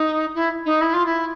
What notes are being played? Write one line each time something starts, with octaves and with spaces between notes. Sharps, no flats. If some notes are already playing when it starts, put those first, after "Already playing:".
Already playing: D#4
E4
D#4
E4
F4
E4